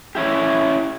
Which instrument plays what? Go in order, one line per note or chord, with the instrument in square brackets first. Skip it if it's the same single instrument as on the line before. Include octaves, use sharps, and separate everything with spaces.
[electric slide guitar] C#4 E4 G4